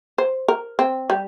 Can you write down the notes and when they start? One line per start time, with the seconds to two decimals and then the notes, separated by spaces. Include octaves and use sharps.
0.18 C5
0.48 A#4
0.79 C4
1.10 G3